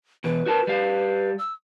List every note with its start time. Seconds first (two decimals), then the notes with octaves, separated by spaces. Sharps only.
0.24 E2 B2 B4
0.46 F#4 A#4 A5
0.67 G3 F5
1.39 E6